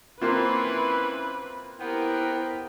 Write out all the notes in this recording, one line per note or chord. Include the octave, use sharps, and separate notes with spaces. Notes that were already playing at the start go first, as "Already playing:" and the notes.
E3 A#3 C4 C#4 F4 B4 B5 C6
B3 E4 G4 A#4 C5 G5